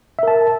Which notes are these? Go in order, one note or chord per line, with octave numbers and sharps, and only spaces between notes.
A#4 E5 A5